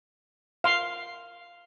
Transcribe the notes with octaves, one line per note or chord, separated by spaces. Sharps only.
F5 C6